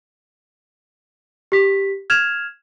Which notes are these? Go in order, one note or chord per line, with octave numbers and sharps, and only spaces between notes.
G4 B6
F6 G#6 E7 F7